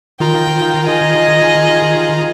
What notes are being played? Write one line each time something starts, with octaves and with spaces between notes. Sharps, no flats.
D#3 F4 A#4 G5 A#5
G#4 D#5